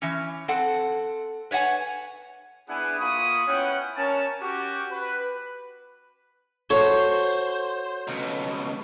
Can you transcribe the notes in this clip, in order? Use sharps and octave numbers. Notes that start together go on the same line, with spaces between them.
E3 C#4
C4 A4 F#5
B4 C#5 D#5 F#5 G#5
B3 D4 E4 G#4 F#5 G#5
A#3 F4 B5 C#6 D#6
B3 C#4 E4 C#5 F#5 G5
C#4 A#4 C#5 A5
C#4 F#4 G4
B4
F#4 A4 C5 C#5
C#2 B2